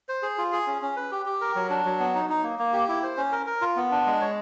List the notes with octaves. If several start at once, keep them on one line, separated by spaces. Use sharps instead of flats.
C5
G#4
F4
G#4
C#4
C#4
B4
G4
G4
A#4
F#3
D4
F#3
B3
D#4
D#4
A#3
A#3
G4
E4
C5
C#4
A#4
A#4
F4
B3
D4
G#3
C#5